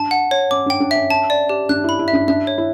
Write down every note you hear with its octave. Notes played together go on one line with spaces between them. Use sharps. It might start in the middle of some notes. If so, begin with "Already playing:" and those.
Already playing: D4 A5
F#5
C#5
C#4 D6
D4 G5
D4
C#4 E5
A5
D5
G4
D4 F#6
E4 B5
E4
E5
D4
D4 E5
C#5
E4